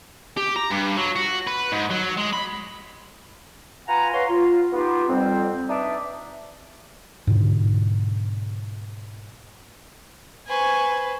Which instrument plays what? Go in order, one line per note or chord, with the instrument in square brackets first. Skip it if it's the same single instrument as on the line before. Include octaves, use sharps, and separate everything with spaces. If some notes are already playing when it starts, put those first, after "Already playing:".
[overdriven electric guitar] G4
A#5
G2
F#3
F#4
B4
G#2
F#3
G#3
B5
[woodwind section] F4 B4 F#5 G#5 A#5
B4 C#5 F5 F#5 A#5 C6
F4
B3 D#4 F4 G4
F2 G3 C4
D4 D#4 B4 D5 E5
[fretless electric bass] G#2 B2 D3
[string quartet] B4 C5 [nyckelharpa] G#5 C#6